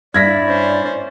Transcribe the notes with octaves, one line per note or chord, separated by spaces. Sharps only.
G2 E4 D5 G#6 A#6 B6
C#4 C5